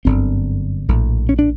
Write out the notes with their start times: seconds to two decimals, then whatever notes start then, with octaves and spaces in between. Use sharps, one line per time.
0.05 G1 F#2 D3 C4
0.88 A#1 A2
1.29 C#4
1.39 D4